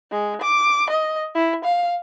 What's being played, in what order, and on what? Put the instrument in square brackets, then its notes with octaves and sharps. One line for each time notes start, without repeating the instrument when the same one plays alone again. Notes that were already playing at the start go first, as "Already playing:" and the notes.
[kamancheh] G#3
D6
D#5
E4
F5